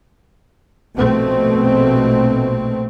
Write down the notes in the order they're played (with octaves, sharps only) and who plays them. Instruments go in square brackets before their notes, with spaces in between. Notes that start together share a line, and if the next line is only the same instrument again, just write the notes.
[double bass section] A#1 B2 A3 C4